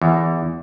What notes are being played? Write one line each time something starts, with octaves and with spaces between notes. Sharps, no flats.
E2